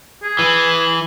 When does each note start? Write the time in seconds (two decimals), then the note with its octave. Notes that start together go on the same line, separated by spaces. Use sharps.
0.23 G#4
0.39 E3